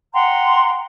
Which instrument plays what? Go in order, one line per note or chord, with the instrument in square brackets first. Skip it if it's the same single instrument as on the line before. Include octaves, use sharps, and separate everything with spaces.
[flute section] F#5 G5 A#5 C6